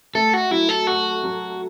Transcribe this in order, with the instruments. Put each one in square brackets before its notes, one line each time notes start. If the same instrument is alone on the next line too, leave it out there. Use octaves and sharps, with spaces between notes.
[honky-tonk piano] A3 [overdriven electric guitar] A4
[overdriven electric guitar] F#4
[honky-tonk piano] F#3 [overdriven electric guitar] E4
[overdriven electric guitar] A4
[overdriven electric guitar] F#4 [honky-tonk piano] A4
[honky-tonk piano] F#3